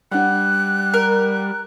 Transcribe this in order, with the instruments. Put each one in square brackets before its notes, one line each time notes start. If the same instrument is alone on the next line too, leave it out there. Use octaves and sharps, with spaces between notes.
[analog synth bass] G3 [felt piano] D4 F#5 [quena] F#6
[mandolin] A#4